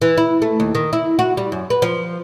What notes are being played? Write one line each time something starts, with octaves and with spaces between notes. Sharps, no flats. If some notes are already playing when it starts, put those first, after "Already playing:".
E3
E4
A3
D#2
D#3
E4
F#4
G3
F#2
B4
F3